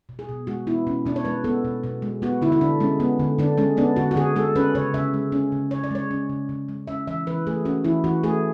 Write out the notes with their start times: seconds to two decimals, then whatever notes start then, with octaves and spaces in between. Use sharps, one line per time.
0.09 B2
0.19 G#4
0.29 B2
0.47 G#3 F#4
0.67 B3 E4
0.87 B2 C#4
1.06 B2 D4
1.16 C#5
1.25 G#3 B4
1.44 B3 A4
1.65 B2
1.84 B2
2.02 G#3
2.22 B3 F#4
2.42 D3 E4
2.52 E4
2.61 D3 D4
2.80 G#3 C#4
3.00 B3
3.20 D3
3.38 D3 D4
3.58 G#3 C#4
3.77 B3 D4
3.96 D3 F#4
4.11 F#4
4.16 D3 G#4
4.36 G#3 A4
4.55 C#4 B4
4.75 C#3 C#5
4.94 C#3 E5
5.14 G#3
5.32 C#4
5.52 C#3
5.71 C#3 C#5
5.84 D5
5.91 G#3 C#5
6.11 C#4
6.29 C#3
6.49 C#3
6.69 G#3
6.87 C#4 E5
7.07 E3 E5
7.27 E3 B4
7.47 A3 G#4
7.65 C#4 F#4
7.84 E3 E4
8.04 E3 F#4
8.24 A3 G#4